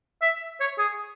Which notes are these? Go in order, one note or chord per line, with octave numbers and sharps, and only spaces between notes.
E5
C#5
G#4